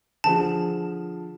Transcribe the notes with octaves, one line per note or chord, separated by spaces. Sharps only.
D3 F3 G#4 A5